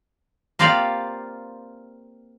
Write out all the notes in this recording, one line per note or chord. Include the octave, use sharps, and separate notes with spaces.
A#3 C4 F4 G4 D5 F5